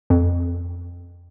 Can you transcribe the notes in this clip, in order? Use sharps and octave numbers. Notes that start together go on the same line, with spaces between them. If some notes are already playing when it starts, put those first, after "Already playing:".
F2